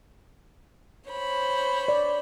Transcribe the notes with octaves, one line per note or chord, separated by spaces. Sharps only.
C5 C#5 B5
D5